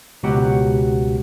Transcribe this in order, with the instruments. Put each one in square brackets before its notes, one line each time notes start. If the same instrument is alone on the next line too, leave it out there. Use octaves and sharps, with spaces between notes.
[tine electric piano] C#2 B2 F#3 F#4 G4 F#5